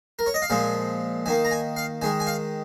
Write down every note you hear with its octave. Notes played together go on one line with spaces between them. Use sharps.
A#4
C#5
D#5
F5
A#2 F3 G#3 G#5
D#3 A#3 G#5
A#5
G#5
F5
D#3 G#3 G#5
G#5
F5